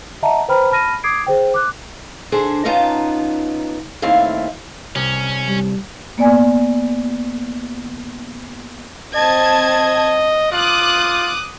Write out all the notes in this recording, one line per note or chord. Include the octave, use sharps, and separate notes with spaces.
D#5 E5 F#5 A5 A#5
B4 C5 G5 A#5 B5 F6
A5 B5 F6 A#6 D#7
D6 D#6 G#6 C7 D7
G#4 C5 G5
D6 F#6
D3 D4 G#4 C5
B3 C#4 D#4 F4 A5 A#5
D#2 A3 C4 E4 F5
C2 C#4
G3
A#3 B3 D5 G#5
C4 D#5 A5 G#6
F4 D6 D#6 F#6